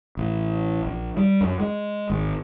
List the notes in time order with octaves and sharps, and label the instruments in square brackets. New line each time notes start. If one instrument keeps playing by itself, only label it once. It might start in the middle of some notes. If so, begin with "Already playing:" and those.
[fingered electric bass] A1
A#1
G3
F#2
G#3
G#1